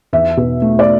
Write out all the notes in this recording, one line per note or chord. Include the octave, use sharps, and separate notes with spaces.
E2 E5
B2
A3
D5